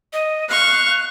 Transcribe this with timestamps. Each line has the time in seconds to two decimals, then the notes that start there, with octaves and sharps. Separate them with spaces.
0.13 D#5
0.49 F5 C#6 F#6